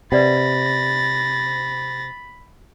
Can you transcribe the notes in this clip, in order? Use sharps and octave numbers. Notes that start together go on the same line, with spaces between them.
C3 B4 D5 F#5 B5 A6 A#6